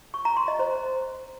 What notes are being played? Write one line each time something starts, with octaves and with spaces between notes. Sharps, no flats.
C#6
A#5
C6
D#5
C5